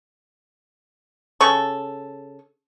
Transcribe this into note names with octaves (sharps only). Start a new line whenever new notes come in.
C#3 A4 C#6